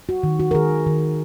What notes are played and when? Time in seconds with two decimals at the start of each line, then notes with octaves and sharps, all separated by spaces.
0.09 F#4
0.23 D#3
0.40 F#4
0.51 A#4
0.55 D#3 G#4
0.86 D#3